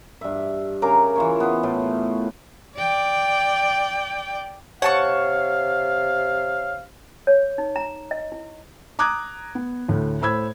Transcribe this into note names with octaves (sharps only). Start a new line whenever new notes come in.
G2 E5
C#3 A#4 A#5 D6
E3 F4 C#5
B3 F4
A2 A3
D5 G5
C3 C#5 F5 F#5 A5 C#6
C#5
D#4
A#5
D#5
E4
A#5 D6 D#6 F#6 G#6
B3
D2 A2
A2 C5 B5 E6 G#6